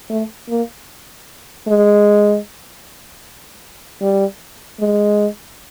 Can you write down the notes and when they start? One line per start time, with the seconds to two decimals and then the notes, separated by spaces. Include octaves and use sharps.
0.10 A3
0.49 A#3
1.67 G#3
4.01 G3
4.80 G#3